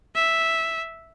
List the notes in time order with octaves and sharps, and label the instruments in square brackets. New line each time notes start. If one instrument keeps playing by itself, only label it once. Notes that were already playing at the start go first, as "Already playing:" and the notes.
[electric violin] E5